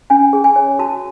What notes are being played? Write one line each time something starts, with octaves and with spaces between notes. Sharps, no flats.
C#4 G#5
G#4
G#5
C#5
F#4 A5